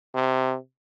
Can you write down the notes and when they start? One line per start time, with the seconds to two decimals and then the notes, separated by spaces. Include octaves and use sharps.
0.15 C3